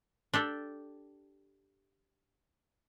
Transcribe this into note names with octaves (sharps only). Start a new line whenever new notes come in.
D4 G4 A4